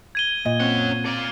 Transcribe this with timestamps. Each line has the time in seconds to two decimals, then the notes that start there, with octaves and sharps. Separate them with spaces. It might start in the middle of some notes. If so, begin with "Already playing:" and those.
0.15 G#6 D#7 G7
0.46 A#2 D#5
0.61 C4 C#4 F#5
1.06 F4 D5